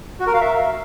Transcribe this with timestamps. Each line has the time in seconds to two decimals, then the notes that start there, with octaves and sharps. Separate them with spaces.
0.20 F#4
0.27 A#4
0.34 F5
0.41 E5